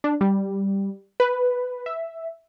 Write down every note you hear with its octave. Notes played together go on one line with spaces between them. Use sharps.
D4
G3
B4
E5